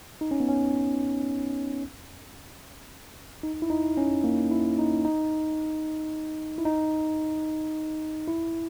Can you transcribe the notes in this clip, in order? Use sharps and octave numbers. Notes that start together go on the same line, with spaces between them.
D#4
C#4
B3
C#4
D#4
E4
D#4
C#4
A#3
E4
D#4
D#4
E4
D#4
E4